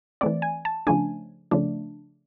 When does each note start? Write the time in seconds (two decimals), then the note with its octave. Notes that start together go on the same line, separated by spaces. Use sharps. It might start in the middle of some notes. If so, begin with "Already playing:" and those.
0.21 E3 A3 C4 D5
0.42 G#5
0.65 A5
0.87 C#3 F3 A3 D4 G#5
1.51 C#3 F3 A3 D4